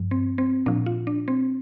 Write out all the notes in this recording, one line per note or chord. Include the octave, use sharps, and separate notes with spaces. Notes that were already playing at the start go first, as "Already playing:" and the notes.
Already playing: G2 F3
C4
C4
A#2 F3 D4
F4
D4
C4